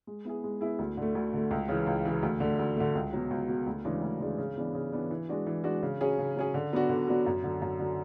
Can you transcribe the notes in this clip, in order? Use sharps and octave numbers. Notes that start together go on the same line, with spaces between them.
G#3
B3 E4 G#4
G#3
B3 E4 G#4
D2
D3 A3
D2
D3 A3
C#2
C#3 E3
C#2
C#3 E3
D2
D3 A3
D2
D3 A3
C#2
B2 F#3
C#2
B2 F#3
D2
C#3 E3 G#3 D4
D2
C#3 E3 G#3 D4
C#3
E3 B3 D4
C#3
E3 B3 D4
E3
G#3 D4 F#4
E3
G#3 D4 F#4
C#3
F#3 C#4 G#4
C#3
F#3 C#4 G#4
D3
F#3 B3 D4 F#4
D3
F#3 B3 D4 F#4
F#2
D3 F#3
F#2
D3 F#3